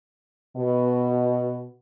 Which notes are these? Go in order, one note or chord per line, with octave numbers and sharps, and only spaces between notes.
B2